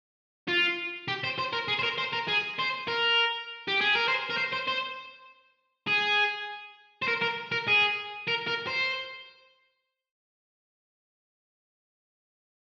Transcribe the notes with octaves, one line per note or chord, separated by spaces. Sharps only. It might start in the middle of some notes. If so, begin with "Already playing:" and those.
F4
G4
C5
C5
A#4
G#4
C5
A#4
C5
A#4
G#4
C5
A#4
G4
G#4
A#4
C5
A#4
C5
C5
C5
G#4
C5
A#4
A#4
A#4
G#4
A#4
A#4
C5